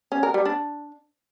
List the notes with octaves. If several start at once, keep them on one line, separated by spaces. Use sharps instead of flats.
C#4
A#4
G3
D4